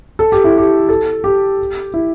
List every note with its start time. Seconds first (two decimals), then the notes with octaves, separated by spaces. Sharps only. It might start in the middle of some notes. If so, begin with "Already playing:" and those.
0.19 A4
0.32 G4
0.44 E4
0.58 G4
0.89 A4
1.24 G4
1.94 E4